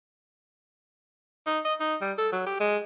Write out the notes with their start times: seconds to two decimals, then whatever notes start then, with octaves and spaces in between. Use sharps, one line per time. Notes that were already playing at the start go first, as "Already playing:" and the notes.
1.46 D#4
1.65 D#5
1.80 D#4
2.01 G3
2.18 A4
2.32 F#3
2.46 G4
2.60 G#3